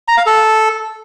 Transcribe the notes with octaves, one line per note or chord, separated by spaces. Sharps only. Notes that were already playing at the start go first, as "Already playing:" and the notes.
A#5
F5
A4